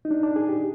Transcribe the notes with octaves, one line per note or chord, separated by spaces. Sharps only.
D#4
D4
D4
G#4
G4